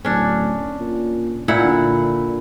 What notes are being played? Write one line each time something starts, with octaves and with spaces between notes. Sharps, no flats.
D1 C#4 D4
A#2
A#2 E4 F#5
D3